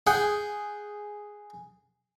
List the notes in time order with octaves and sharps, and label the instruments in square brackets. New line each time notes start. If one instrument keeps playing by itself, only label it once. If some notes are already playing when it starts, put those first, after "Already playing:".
[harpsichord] G#4 F#5 G5